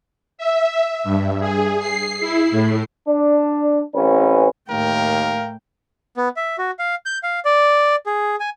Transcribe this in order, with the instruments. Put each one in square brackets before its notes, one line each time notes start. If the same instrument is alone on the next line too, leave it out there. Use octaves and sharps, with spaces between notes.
[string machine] E5
G2
G#4
C7
E4
A2
[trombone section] D4
A1 C4 C#4 B4
[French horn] D#2 [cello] A2 G5 [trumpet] A#4 [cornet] F5
[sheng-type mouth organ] B3
E5
F#4
F5
G6
F5
D5
G#4
G#5